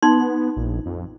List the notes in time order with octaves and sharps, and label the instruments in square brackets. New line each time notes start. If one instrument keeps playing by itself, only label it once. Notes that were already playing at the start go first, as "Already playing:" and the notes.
[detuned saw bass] B3 [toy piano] D#4 C6
[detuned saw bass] A#1
F2